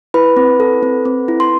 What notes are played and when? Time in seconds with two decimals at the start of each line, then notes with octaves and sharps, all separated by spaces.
0.14 E4 B4 B5
0.37 C4
0.60 A4
0.83 C4
1.05 C4
1.28 E4
1.40 C6